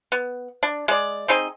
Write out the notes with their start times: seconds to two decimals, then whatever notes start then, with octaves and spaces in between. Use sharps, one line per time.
0.12 B3
0.63 D4
0.88 G#3 D5
1.28 C4 D#4 G#4 D#5